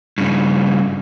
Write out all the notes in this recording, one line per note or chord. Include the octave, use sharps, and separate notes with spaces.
G2 C#3